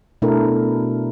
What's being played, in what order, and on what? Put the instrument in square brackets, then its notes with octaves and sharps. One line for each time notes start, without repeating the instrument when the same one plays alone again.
[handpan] B2 A3 D4 E4 A4 A#4